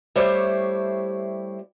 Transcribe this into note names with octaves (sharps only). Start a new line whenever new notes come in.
G3 A3 E4 G4 C5 C#5